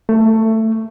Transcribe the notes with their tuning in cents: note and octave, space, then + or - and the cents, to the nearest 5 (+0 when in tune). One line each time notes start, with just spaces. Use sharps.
A3 +15